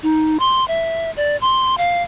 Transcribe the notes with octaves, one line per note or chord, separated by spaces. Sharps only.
D#4
C6
E5
D5
C6
F5